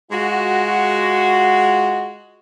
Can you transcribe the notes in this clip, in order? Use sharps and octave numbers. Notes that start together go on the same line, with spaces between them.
G#3 F4 F#4